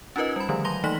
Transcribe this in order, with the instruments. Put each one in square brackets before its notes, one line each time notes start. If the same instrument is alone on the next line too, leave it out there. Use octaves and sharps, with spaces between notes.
[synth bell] C#4 D#4 F4 A#4 B4 D#5
G3 B5
D3 D#3 F3 G3 A3
F#3 A#5 C6 A#6 G7
E3 A3 A#3 D#4 B6 F#7